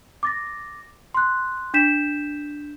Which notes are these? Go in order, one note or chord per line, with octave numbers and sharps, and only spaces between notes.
D6 A6 A#6
C6 F#6
D4 G6 B6 E7